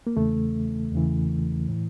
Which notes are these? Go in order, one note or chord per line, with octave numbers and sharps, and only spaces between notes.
A#3
E2 C#3 E3 A3
E2 C#3 E3
A2 E3